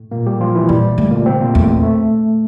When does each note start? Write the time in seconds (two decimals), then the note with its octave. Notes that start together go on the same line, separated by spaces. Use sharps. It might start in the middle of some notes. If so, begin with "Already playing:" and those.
Already playing: A2
0.11 A#2 A#3
0.26 G3 G4
0.40 F3 F4
0.55 E3 E4
0.69 A#2 G3
0.98 D3 A3
1.11 A#2 A#3
1.25 C3 C4
1.40 A#2 A#3
1.54 E2 A3
1.83 A3